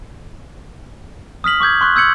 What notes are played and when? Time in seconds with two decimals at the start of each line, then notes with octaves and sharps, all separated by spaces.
1.44 D#6 F6 B6 F#7
1.60 C#6 D6 G6 G#6
1.81 C6 C#6 F#6
1.96 E6 G6 G#6 C#7 F#7